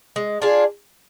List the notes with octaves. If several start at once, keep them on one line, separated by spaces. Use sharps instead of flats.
G#3
D4 F4 G#4